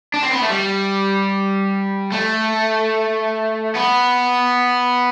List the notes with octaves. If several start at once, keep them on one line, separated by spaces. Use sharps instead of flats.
D4
C4
B3
A3
G3
A3
B3